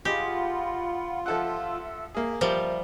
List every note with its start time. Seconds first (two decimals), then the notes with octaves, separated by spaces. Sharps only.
0.05 F4 G4 G#4 D#5 F#5 B5
1.26 F3 A4 E5 F#5 E6
2.15 A#3 G#4 E5
2.41 F3 G3 A#4 E5